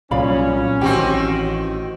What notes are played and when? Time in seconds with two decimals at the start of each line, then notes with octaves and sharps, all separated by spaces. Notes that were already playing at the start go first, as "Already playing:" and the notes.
0.11 C2 A#2 F#3 C#4 D5 F5 B5
0.81 A1 D#3 C4 F#4 G4